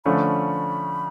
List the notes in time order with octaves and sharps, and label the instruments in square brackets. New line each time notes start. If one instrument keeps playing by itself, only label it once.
[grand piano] D3 F3 A3 C#4 [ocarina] B5